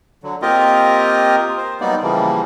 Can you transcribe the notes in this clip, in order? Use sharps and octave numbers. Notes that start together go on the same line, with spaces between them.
D3 F#3
A#3 C4 F4 G4 A#4 D#5
C5
F#3 G3 A#3 B3 D#4 D5
C#3 E3 F3 G3 A#3